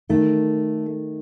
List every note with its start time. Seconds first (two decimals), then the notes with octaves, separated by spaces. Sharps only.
0.09 D#3 A3